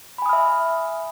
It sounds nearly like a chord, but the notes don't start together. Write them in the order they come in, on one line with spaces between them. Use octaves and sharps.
B5 G#5 D#6 F6 E5